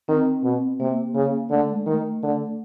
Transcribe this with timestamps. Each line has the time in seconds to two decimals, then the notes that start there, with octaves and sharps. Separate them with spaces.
0.08 D#3 C4
0.44 B2
0.80 C3 A#3
1.15 C#3
1.51 D3 A3
1.69 G#3
1.86 D#3 A3
2.23 D3